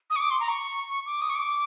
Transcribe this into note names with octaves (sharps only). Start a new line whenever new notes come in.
D#6
C#6
D6
C6
A#5
C#6
D6
D#6
C#6
D6